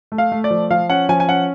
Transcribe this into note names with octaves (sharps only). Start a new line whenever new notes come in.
A3
F5
A3
D5
F3
F3 F5
C#4 F#5
F3 G#5
G#5
C#4 F#5